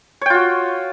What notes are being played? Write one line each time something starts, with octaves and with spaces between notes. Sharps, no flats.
F4 F#4 C#5 G5